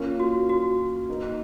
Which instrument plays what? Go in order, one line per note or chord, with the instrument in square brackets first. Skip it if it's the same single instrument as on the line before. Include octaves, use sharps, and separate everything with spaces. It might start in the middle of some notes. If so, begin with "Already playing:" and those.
Already playing: [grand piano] A#3 C#4 F4
[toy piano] F#4
F#4
[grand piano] A#3 D#4 A#4